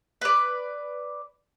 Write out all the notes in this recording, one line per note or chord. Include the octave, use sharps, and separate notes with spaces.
B4 D5